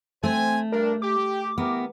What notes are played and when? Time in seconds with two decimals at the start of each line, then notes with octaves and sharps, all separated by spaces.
0.23 A3 C4 C5 G#5
0.72 G2 D4 A#4
1.02 G4 D6
1.58 B3 E4 G4 A#4